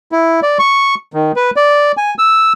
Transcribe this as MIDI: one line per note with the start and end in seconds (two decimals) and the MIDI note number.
0.12 0.40 64
0.43 0.58 74
0.59 0.95 85
1.13 1.32 51
1.36 1.51 71
1.56 1.92 74
1.97 2.14 80
2.19 2.53 88